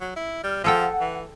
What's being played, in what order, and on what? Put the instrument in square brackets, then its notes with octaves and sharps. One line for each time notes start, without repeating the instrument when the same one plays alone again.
[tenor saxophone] F#3
E4
[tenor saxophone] G3 [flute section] F6
[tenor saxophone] F3 [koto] G#4 A4 G5 [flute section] F#5
[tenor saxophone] E3